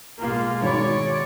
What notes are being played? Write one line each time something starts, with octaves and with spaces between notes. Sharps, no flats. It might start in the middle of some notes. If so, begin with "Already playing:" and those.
B2 G#3 A#3 F4
G#1 F#4 C#5 D5 B5